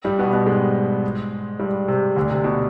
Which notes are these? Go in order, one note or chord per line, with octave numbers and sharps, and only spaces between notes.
G2 G3
B2 B3
B2 B3
G#2 G#3
G2 G3
C3
D2 D3
C3
B2